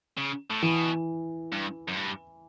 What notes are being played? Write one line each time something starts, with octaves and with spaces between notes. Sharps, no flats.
C#3
A2
B2 E3
G2
F#2
G2